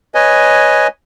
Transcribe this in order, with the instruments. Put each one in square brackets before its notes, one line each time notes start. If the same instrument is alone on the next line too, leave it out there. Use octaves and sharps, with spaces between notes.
[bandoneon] B4 C#5 D#5 G#5